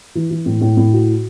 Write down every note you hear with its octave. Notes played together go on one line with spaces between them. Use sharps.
E3
E3
A2
A2
A2
F#4